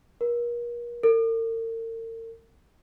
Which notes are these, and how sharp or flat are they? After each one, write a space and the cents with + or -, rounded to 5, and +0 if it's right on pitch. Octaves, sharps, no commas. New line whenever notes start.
A#4 +40
A#4 -45